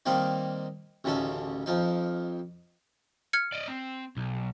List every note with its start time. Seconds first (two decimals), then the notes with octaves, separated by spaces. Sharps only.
0.06 D#3 G3 A#3 C4 D#4
1.04 A1 D2 C#3 D#4 A4
1.66 F2 F3 D#4
3.33 F6 G#6 C#7
3.52 D5 D#5
3.67 C4
4.17 B1